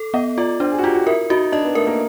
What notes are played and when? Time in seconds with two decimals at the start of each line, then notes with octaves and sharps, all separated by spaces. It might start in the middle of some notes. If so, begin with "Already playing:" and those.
Already playing: A4
0.14 B3 D#5
0.38 F4 D5
0.60 D4 C5
0.72 G#4
0.78 F#4
0.83 F4 G4
0.95 F#4
1.07 E4 A#4
1.30 D#4 F#4
1.52 D4 D#5
1.64 B3
1.75 A3 A#4
1.87 A#3